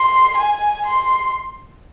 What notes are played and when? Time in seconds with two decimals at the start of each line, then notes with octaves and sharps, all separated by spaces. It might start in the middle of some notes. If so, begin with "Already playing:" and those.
Already playing: C6
0.38 G#5
0.87 C6